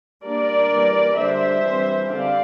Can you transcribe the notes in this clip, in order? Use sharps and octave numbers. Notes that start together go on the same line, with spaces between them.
G3 A#3 D4 A#4 D5
E3 G3 A#3
D3 G3 D4 C5 E5
E3 G3 C4
D3 G3 C4 D5 F5